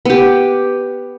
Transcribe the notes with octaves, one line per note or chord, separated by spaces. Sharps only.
B3 G4